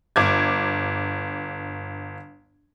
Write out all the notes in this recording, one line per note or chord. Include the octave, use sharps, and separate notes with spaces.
G1 D6 G#6